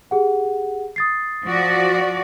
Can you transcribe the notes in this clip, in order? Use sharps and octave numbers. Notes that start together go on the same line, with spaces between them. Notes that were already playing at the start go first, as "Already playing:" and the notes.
G4 G#4 F#5
D#6 A6 C7
F3 F#4 D5